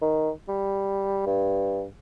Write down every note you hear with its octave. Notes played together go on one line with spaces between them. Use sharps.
D#3
G3
G2